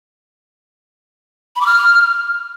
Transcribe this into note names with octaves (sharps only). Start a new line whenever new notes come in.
B5
D6
F6